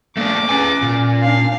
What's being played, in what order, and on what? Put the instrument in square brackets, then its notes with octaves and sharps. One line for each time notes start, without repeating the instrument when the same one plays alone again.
[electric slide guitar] A3 A#3 D4 [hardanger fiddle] D6
[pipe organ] C#4 [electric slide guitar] G#4 B4 G#5
[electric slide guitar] A#2
[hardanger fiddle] D4 F5